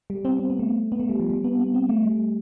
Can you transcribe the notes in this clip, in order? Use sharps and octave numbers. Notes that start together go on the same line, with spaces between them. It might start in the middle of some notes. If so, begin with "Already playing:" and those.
G3
C4
C4
B3
A3
B3
A3
G3
F3
G3
B3
B3
C4
A3
G3